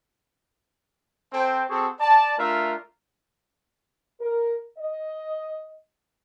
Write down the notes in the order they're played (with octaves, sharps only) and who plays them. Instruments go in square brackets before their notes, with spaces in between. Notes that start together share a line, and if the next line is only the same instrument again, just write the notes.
[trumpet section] C4 A4 C5 G5
C4 F#4 G#4 A4 C#6
D5 A5
A3 D4 F4 A#4 E5
[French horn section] A#4
D#5